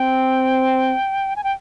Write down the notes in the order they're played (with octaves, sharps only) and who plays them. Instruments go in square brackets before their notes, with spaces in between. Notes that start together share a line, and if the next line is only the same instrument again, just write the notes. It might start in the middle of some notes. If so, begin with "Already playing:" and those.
Already playing: [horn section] C4 [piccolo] G5
[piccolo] G#5
G5